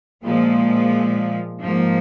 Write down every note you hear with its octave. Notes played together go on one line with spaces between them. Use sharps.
A#2 F3 G#3
G#2 F3 A#3